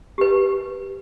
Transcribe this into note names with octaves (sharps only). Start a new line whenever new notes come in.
G4 B4